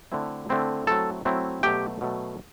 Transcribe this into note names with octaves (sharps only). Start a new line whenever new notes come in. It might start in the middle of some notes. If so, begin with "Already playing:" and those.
D3 A3 C4 E4
D3 A3 C4 E4
F#3 A3 C4 E4 A4 A5
F#3 A3 C4 E4
B2 F#3 A3 G4 G5
B2 F#3 A3